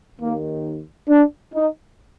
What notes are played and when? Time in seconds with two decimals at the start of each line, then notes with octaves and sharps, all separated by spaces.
0.20 D#2 D#3 A#3
1.09 D4
1.54 D#4